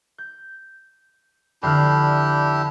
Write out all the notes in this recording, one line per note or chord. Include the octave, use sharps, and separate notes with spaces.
G6
F2 D3 D4 E4 G4 F6